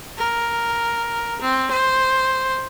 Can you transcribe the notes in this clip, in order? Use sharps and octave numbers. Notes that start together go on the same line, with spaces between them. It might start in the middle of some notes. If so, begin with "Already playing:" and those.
A#4
C4
C5